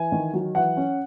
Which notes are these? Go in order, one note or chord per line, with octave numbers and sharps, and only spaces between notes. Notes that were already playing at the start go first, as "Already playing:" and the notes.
Already playing: E3 G#5
D#3
F#3
E3 F#5
C#4